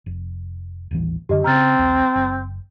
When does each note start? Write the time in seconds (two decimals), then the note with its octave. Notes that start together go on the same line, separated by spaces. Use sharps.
0.06 F1
0.91 D#1 A1 E3
1.29 F#2 D3 G4 D#5
1.44 C#3 C4 C#4 A#5 F6 A6
1.79 A#1 D#2
2.15 F#1